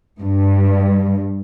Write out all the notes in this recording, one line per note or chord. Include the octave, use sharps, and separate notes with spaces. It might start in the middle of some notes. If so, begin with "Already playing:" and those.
G2